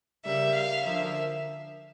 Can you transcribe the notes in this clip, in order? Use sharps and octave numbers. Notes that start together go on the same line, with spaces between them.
C#3 G3 A#3 E5
F5
D3 F3 A#3 E5